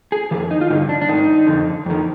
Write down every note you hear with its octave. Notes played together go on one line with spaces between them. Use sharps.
G#4
F2 D#3 G4
D#4
F4
G2 D3 D#4
D4
D4
G#2 D#3 D#4
F2 D3
F2 D#3